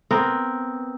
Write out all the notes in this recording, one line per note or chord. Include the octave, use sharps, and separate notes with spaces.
B3 C4 A#4